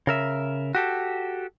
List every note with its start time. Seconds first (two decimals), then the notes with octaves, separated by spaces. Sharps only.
0.07 C#3 A#4 E5
0.75 F#4 G4 A4